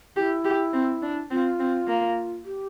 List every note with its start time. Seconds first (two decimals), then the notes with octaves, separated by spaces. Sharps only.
0.16 E4 G4
0.45 G4
0.73 C4
1.02 D4
1.31 C4 F4
1.59 C4
1.88 A#3
2.45 G4